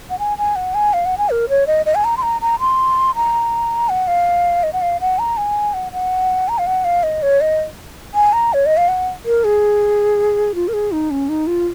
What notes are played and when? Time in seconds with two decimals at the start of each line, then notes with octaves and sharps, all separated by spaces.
0.10 F#5
0.19 G#5
0.38 G#5
0.56 F#5
0.74 G#5
0.93 F5
1.05 F#5
1.18 G#5
1.30 A#4
1.49 C#5
1.67 D#5
1.86 D#5
1.95 G#5
2.04 A#5
2.17 C6
2.23 A#5
2.41 A#5
2.60 C6
3.15 A#5
3.89 F#5
4.07 F5
4.63 D#5
4.73 F#5
4.82 F5
5.01 F#5
5.19 A#5
5.37 G#5
5.74 F#5
5.92 F#5
6.49 A#5
6.58 F5
6.67 F#5
6.85 F5
7.03 D#5
7.22 C#5
7.41 D#5
8.14 G#5
8.33 A#5
8.53 C#5
8.66 D#5
8.77 F5
8.88 F#5
9.25 A#4
9.44 G#4
10.55 F4
10.68 A#4
10.73 G#4
10.92 D#4
11.11 C#4
11.29 D#4
11.47 F4